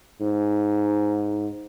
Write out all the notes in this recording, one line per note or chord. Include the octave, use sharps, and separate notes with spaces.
G#2